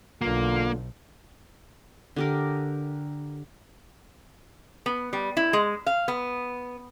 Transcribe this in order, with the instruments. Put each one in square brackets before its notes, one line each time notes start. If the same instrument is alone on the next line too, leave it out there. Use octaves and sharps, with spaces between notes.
[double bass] B1 [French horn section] D3 F4 [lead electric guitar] A#3
[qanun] D3 G4 A#4
[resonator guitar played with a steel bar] B3
G3
E4
G#3
F5
B3